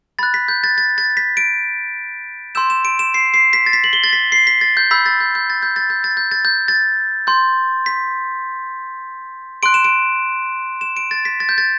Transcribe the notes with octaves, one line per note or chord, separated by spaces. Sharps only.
B5 F#6 A6
B6
G6
A6
A6
A6
B6
D7
C6 E6 G6 E7
E7
D7
E7
C7
C7
B6
A6
B6
F#7
G7
A6
B6
C7
B6
A6
G6
B5 E6 G6 B6
A6
G6
G6
A6
G6
A6
G6
A6
G6
A6
G6
A6
C6 G6
B6
C6 F#6 D7
E7
D7
E7
D7
A6
B6
A6
G6
A6